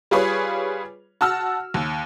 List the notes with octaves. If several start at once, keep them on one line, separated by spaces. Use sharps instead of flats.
G3 F4 G#4 B4 C#5
F#4 A5 E6 F6
D#2